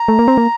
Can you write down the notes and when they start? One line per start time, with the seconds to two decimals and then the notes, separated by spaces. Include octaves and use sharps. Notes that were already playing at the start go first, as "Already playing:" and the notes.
Already playing: A#5
0.08 A3
0.19 A#3
0.28 C4
0.37 A#3